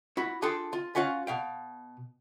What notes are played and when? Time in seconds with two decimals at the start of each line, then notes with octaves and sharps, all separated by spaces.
0.17 E4 F#4 B5
0.42 D4 F4 G#4 A4 G5 C6
0.73 F4
0.95 C#4 F4 F#4 C#5 F5
1.27 B2 F5 G5